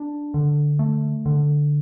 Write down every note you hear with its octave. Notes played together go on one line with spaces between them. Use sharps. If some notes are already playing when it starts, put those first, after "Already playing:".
Already playing: D4
D3
A3
D3